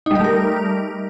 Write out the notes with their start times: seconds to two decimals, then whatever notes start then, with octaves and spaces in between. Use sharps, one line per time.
0.06 D#4
0.11 G3
0.15 G4
0.20 A3
0.24 A#4